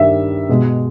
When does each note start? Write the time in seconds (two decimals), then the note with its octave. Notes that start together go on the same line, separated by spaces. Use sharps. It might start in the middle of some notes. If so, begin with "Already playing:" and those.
Already playing: G2 D#3 G3 E5
0.49 B2 G#3